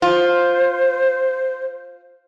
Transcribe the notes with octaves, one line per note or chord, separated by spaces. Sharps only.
F4 C5